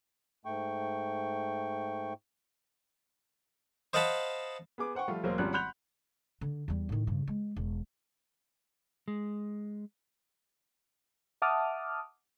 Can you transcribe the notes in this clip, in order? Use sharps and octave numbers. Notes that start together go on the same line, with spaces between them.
G#2 A3 G5 C#6
C5 D#5 F5 F#5 A5 B5
B3 G#4 D6
C5 F#5 G5 C#6
F3 G3 A3 F4
E1 F#3 A#3 C5
G#1 F3 G3 C#4 F#6
F#5 B5 C6 F#6 G6 F7
D3
E2 G3
A2 D#3
G2 C#3
G#3
E1
G#3
E5 F#5 A5 D6 D#6 F6